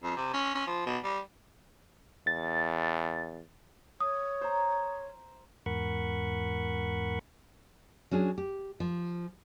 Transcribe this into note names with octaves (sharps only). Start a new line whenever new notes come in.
F2
C3
C#4
C#4
F3
B2
G3
E2 A6
C#5 D#6
C5 A#5
E2 G#2 A#4 F#5 B5 C#6
F#3 C#4 D4 G#4
G4
F3